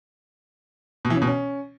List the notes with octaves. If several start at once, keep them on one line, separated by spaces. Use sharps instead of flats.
B2
E3
C#3
B2
C#4